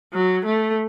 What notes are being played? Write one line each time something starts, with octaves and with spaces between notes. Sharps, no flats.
F#3
A3